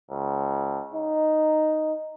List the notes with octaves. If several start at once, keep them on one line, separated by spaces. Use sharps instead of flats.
C#2
D#4